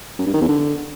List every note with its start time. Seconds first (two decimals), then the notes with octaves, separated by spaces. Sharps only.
0.19 F#2
0.26 G2
0.34 D#3
0.41 E2
0.49 D3